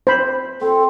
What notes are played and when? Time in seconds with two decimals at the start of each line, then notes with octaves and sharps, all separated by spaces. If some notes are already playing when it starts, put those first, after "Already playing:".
0.07 C5 B5
0.61 C4 A4